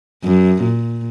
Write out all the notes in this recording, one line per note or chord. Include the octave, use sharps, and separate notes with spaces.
F#2
A#2